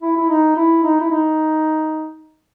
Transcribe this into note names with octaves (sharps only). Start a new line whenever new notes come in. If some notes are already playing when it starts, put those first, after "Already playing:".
E4
E4
D#4
E4
D#4
E4
D#4